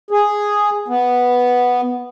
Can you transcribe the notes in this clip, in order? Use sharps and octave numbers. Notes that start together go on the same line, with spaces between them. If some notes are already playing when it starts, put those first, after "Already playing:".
G#4
B3